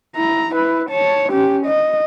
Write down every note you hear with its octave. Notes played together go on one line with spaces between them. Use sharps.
E4 A#5
E4 B4
C#5 A5
C#4 G4
D#5